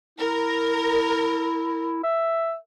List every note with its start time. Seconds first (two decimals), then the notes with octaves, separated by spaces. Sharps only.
0.18 E4 A#4
2.03 E5